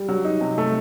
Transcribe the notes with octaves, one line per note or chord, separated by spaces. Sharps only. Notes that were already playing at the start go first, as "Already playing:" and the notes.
Already playing: G3
F#3
D#4
C3
A3